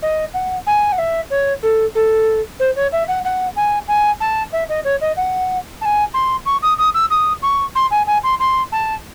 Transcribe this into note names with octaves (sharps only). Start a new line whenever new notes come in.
D#5
F#5
G#5
F#5
E5
C#5
A4
A4
C5
C#5
E5
F#5
F#5
G#5
G#5
A5
E5
D#5
C#5
D#5
F#5
A5
G#5
C6
C#6
D#6
D#6
E6
D#6
C#6
C6
G#5
G#5
C6
C6
A5